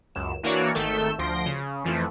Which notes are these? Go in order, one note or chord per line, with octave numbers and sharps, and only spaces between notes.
C#2 F#2 E7
E3 A#3 D4 F#4 C#5 D5
G#1 D#3 A3 A4 E6 G6
D2 F3 C6 A#6 D7
C#3
F2 E3 F3 A3